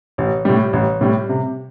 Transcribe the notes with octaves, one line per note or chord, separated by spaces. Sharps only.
A1
A2 G3
A1
A2 G3
C3